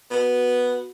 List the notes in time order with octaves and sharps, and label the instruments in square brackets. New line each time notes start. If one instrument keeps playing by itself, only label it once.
[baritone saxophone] B3 [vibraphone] F#4